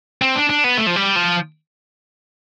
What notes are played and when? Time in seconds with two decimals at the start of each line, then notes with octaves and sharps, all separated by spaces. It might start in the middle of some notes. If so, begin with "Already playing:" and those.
0.22 C4
0.36 D4
0.50 D4
0.64 B3
0.77 A3
0.87 F3
0.96 G3
1.16 F3